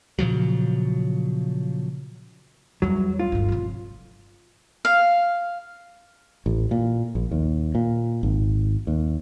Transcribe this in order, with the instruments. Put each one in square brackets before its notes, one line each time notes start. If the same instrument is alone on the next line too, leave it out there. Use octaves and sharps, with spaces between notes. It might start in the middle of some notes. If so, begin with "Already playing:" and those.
[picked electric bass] A#2 C#3 F3 F#3
[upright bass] E2 G3 [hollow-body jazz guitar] F#3
[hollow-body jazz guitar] F4
[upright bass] G1 D2
C3 F3
[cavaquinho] F5
[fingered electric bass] A1
A#2
A#1
D#2
A#2
G#1
D#2